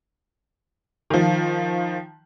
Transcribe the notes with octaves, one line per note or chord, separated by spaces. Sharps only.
D#3 F3